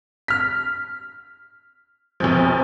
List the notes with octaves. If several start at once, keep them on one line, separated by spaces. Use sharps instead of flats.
F6 B6
F1 B1 F3